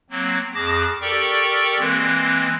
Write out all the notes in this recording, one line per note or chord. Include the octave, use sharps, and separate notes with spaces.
F#3 A#3 C4
F2 G#4 A5 D6 A#6
G4 A4 A#4 D5 G5 C#6
E3 G#3 A#3 C4